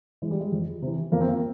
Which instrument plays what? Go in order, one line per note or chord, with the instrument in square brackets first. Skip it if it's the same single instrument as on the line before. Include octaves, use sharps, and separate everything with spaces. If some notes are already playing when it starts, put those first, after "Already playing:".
[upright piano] E3 G#3
G3
G#3
F2
C3 E3
F2 A#3
C4
A#3